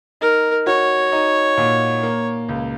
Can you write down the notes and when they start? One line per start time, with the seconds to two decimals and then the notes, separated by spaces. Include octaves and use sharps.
0.21 D#4 A#4
0.67 F#4 C#5
1.12 D#4
1.57 A#2
2.03 A#3
2.49 C#2